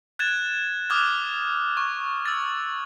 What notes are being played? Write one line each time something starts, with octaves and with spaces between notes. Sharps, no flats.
F#6 G#6 A6 E7
D6 D#6 F6 F#6 G#6
C#6
E6 A6